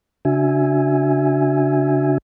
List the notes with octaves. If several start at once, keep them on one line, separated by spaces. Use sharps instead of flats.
C#3 D4 F#4 E5 G#5